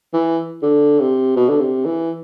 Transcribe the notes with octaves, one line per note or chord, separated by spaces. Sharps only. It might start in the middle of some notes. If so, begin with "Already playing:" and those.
E3
D3
C3
B2
D3
C3
E3